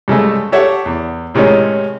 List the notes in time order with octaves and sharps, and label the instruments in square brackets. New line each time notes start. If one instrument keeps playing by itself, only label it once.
[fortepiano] G2 C#3 G#3 A3
G4 A4 C#5 E5 F#5
E2
A2 C3 D#3 G#3 C#4